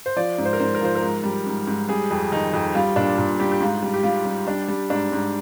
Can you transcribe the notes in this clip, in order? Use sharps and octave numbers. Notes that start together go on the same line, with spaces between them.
C5
F3 D5
G#2
C5
A#4
G#2 C5
A#4
F3 C5
A#4
G#2
G3
G#2
G#2
G3 G#4
F2
D#3 D#4
F2
G3 F4
A#2 D4
A#2
G3 G4
G4
G#2 F4
G3
G4
G3 F4
G3
G3 D4
G3
G#2 D4
G#2